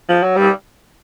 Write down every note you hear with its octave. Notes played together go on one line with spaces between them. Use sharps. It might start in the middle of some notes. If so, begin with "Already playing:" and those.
F3
F#3
G3